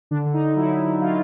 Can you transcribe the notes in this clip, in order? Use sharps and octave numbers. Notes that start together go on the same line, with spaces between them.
D3 D4
D3
D#4
D3
F#3 E4
F#3
D3
F#3 F4